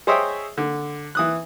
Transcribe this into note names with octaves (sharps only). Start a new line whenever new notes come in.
G#4 C5 C#5 D#5 E5 G5
D3
E3 D#6 F#6